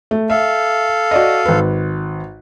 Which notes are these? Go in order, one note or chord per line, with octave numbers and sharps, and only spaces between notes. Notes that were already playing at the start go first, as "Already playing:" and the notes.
A3
A4 E5 F5
F#4 D5 D#5
G#1 B4